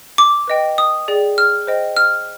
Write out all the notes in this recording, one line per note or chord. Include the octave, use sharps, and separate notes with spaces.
D6
B4 D#5 G5
D#6
G#4 D5 G5
F6
C5 D#5 G5
F6